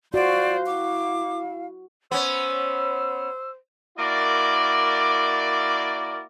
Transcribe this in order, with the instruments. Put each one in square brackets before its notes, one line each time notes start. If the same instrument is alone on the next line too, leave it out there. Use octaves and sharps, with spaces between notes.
[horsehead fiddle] F4 C5 [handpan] F#4 [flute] D5 [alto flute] F5
[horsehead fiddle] E4 [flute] D6
[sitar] B3 C#4 [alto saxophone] C5 [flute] E6
[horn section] A#3 E4 F#4 A#4 D5